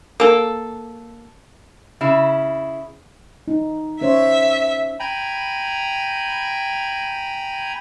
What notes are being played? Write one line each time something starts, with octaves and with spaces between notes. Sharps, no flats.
A#3 A4
C#3 E4
D#4
C#4 C5 C#5 E5
G5 G#5 A#5 B5